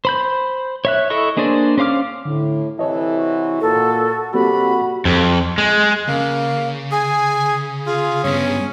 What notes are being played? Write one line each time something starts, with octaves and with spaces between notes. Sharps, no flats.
C5 B5 G6
C#5 E5 F#6
E4 A4 D#5 C#6
A#3 D4 G#4 C5 D5
C#4 C5 F5 D6 F6
A2 D3
C3 E3 A4 C#5 D#5
F#4
A#2 A4
C3 G3 A#3 C4 F#4 A4 D5 B5
F2
G#3
C#3 A#3
G#4 G#5
F4 G#4
G2 B3 C#4